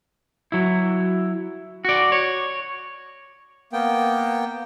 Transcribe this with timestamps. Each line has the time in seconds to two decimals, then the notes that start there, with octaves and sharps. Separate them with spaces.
0.52 F#3 E4
1.85 F#4 D5
2.12 C#5
3.73 A#3 B3 G5